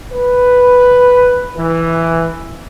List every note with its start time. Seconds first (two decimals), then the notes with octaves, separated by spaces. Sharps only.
0.12 B4
1.56 E3